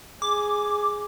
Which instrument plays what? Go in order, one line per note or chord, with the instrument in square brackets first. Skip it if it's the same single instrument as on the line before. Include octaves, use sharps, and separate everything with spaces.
[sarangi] G#4 [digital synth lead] D6